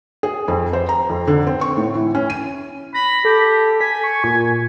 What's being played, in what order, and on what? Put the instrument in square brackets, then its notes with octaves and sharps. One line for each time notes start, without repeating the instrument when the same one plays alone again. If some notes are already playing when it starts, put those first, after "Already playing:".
[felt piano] G#4
F2
C5
A#5
F2
D3
C4
C#6
A2
E3
C#4
D#7
[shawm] B5 [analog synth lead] A#6
[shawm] G4 [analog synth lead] A4
[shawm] G#5 [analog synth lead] B6
[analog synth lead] C#6
A#2